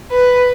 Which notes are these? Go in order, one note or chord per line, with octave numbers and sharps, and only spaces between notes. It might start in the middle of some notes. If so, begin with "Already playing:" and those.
B4